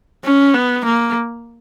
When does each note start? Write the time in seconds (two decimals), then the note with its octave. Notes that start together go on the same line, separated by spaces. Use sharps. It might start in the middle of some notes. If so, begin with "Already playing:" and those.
0.25 C#4
0.54 B3
0.86 A#3